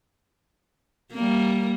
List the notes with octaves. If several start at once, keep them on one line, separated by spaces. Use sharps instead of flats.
G3 A#3